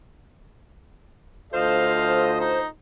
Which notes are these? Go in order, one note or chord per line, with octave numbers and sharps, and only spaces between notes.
D2 F4 A4 C5 D#5 F5
D#4